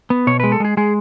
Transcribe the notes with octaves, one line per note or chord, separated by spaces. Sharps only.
B3
B2 C#5
G#3 B4
A4
G#3 G#4
G#3 G#4